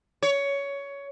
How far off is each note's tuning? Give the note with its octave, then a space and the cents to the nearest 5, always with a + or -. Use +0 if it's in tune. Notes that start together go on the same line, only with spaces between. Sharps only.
C#5 +15